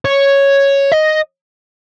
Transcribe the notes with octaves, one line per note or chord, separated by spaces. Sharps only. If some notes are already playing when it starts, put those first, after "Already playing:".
C#5
D#5